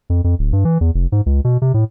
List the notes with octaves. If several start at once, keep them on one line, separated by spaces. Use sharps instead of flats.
F2
F2
D1
G2
E3
E2
F1
G#2
C#2
B2
C3
A2